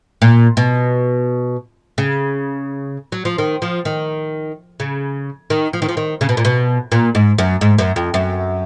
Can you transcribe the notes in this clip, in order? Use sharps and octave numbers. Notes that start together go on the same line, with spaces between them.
A#2
B2
C#3
F#3
F3
D#3
F3
D#3
C#3
D#3
F3
D#3
F3
D#3
C#3
B2
A#2
B2
A#2
G#2
F#2
G#2
F#2
F2
F#2